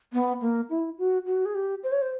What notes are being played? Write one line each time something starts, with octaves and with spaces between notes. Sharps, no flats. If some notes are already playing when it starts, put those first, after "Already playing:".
B3
A#3
E4
F#4
F#4
G#4
G4
C5
C#5
C5